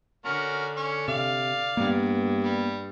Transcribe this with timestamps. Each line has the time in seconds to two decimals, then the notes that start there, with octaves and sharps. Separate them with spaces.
0.25 D3 C#4 F#4 A#4
0.77 C#4 C#5
1.08 C3 D5 F5
1.77 G2 A#3 B3
2.43 G3